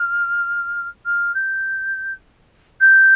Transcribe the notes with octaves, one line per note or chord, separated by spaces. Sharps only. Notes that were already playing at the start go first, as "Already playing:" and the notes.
Already playing: F6
F6
G6
G6